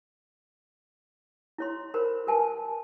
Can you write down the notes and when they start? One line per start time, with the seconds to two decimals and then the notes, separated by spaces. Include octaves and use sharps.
1.58 E4 C#5 C6
1.94 A#4 C5 B5
2.27 A#4 B4 G#5 A5